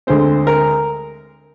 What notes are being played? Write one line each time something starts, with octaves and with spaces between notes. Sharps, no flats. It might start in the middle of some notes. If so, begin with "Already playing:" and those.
D2 D3 G#3 C4 C5
A#4